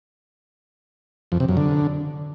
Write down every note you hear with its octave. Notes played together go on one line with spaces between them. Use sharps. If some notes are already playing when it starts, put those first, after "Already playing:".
F2
C3
F#2
D3